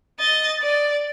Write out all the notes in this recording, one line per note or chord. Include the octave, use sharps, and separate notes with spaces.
D#5 A6
D5